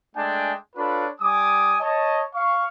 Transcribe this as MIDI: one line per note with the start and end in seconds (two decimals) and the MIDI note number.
0.15 0.53 56
0.15 0.53 57
0.15 0.53 62
0.15 0.53 79
0.15 0.53 80
0.76 1.06 62
0.76 1.06 65
0.76 1.06 69
0.76 1.06 71
0.76 1.06 73
0.76 1.06 83
1.20 1.75 55
1.20 1.75 80
1.20 1.75 86
1.20 1.75 87
1.80 2.23 73
1.80 2.23 75
1.80 2.23 81
2.34 2.67 77
2.34 2.67 85